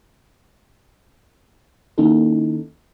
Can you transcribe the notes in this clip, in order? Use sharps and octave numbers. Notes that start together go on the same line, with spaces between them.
D#3 A#3 C#4 D#4 E4 A4